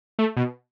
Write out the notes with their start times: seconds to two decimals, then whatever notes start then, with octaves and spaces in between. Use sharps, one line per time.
0.19 A3
0.37 B2